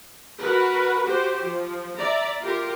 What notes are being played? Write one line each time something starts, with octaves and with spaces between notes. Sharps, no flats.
F#4 A#4 B4
F#4 G4 C5
F3
D5 E5 A#5
F4 G4 A#4